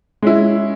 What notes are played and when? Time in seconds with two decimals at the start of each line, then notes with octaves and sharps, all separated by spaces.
0.22 G#3 C#4 E4